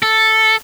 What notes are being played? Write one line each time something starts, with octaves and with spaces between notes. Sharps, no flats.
A4